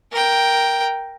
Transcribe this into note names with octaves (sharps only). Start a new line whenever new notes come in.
A#4 G5